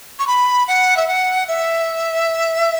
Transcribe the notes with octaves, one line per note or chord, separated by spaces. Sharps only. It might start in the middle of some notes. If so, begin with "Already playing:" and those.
C#6
B5
F#5
E5
F#5
E5